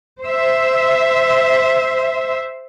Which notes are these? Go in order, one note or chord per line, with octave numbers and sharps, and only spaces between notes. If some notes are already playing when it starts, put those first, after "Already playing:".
C5 E5